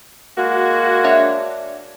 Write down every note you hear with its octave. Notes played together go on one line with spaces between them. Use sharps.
G#3 A#3 F#4
D4 C#5 E5